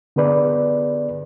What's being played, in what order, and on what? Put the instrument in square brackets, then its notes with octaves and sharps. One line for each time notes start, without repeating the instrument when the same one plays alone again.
[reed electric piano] D3 B3 G#4 B4 D5